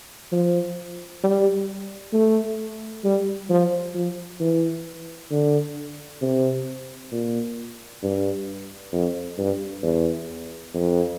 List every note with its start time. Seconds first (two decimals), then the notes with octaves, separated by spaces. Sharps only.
0.32 F3
1.23 G3
2.13 A3
3.04 G3
3.50 F3
3.95 F3
4.40 E3
5.31 D3
6.22 C3
7.12 A#2
8.03 G2
8.93 F2
9.38 G2
9.83 E2
10.75 F2